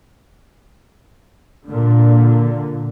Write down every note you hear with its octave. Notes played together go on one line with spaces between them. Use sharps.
A#2 D3